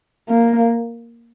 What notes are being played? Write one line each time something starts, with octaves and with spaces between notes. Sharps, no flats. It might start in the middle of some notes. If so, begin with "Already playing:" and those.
A#3